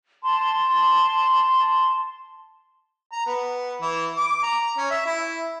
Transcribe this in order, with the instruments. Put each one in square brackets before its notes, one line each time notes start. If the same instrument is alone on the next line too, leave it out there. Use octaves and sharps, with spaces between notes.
[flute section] A5 C6
[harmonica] A#5
B3
E3
D6
A#5
C#4
E5
E4